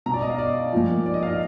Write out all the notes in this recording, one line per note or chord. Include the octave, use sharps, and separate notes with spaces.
B2 A#5
D5
D#5
F5
D5
A#2 F3
D5
D#5
F5
D#5